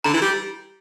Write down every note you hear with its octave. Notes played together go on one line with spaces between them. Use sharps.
D3 A#5
E3
G3